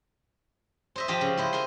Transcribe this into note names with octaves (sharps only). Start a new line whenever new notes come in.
C5 D#5 E5
F3 G4 C5 D#5
C#3
E4 C5 D#5
A#4 C5 D#5 C6